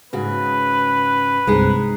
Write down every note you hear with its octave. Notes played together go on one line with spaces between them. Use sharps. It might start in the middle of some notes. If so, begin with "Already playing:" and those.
G#2 C#3 F#4 B4
C2 G2 G#3 C4 D#4 G#4